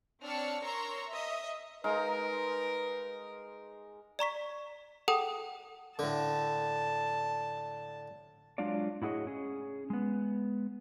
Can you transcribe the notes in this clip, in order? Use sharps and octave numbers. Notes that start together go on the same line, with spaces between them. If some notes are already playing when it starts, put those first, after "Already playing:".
C4 D4 C#5 E6 F6 C#7
A#4 C#5 A#5 C6 C#6 E6
D#5 E5
G#3 D#4 A#4 B4 F5
D5 A#5 C#6 B6
G#4 A4 F#5 G5 A5 D#6
A2 D3 A5
F#3 G#3 D4 F4 F#4 D5
A2 E4 F#4 G#4 C#5 D#5
C#4 G#4
G#3 B3